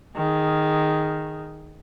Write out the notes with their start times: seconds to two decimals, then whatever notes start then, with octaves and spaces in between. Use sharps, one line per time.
0.16 D#3 G#4